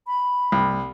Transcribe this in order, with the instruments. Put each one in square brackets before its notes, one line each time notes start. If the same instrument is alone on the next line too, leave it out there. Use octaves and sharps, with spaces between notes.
[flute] B5
[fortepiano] C2